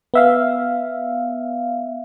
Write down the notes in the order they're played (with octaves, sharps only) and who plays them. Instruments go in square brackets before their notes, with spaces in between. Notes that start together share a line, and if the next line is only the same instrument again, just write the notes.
[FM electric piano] B3 E5 F5